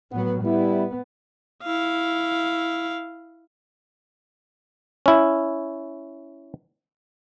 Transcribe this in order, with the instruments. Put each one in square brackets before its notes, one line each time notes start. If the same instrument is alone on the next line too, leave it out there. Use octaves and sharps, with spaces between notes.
[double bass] A2 F#3 [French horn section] B3
[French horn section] G3 E4 [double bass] B3
[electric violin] E4 F5
[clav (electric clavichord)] C#4 E4